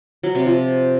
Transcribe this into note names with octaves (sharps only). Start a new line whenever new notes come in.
F#3
C3
F3